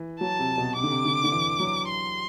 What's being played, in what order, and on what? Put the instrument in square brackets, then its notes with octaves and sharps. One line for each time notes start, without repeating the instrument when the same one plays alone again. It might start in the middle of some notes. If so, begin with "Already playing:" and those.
Already playing: [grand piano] E3
[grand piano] F#3 [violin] A5
[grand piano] C3
B2
[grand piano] C3 [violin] D6
[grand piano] D3
C3
D3
D3
E3
F#3
[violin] C6